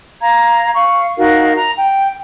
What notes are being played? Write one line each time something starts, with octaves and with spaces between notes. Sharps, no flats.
F5 A#5 G#6
F5 C#6
D#4 F#4 A#4 F5
A#5
G5